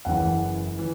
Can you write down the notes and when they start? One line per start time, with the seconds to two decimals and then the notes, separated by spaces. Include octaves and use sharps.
0.05 F#1 F#2 E3 F#5
0.79 E3